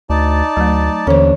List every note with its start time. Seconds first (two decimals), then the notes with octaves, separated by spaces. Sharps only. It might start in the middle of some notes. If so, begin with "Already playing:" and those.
0.10 D2 D#4 D5 A5
0.57 D2 F#3 A3
1.07 D#2 D3 E3 C#4 D4 C5